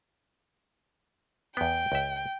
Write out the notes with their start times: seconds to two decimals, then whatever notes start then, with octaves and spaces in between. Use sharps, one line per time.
1.57 E2 B3 G5
1.92 C#2 E5